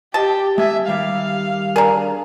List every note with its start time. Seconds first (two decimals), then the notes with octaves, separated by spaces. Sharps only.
0.14 G4 D#5 A5
0.58 G#3 E5 G#5
0.88 D#3 G3 G4 F5
1.76 D4 G#4 A#4 D5 A#5